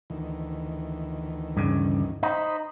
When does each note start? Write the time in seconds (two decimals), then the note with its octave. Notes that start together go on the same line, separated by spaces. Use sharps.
0.10 D2 D#3 E3
1.57 G2 C#3
2.23 D#4 C5 B5